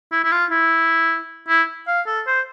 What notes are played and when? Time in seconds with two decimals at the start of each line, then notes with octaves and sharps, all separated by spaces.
0.12 E4
0.24 E4
0.31 F4
0.50 E4
1.48 E4
1.87 F5
2.06 A4
2.27 C5